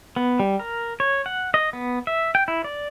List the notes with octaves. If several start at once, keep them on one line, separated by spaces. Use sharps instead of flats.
B3
G3
A#4
C#5
F#5
D#5
B3
E5
G5
E4
D5